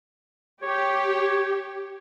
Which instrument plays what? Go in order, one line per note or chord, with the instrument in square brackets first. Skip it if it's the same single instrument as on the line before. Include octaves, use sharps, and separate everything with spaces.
[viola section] G4 [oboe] C#5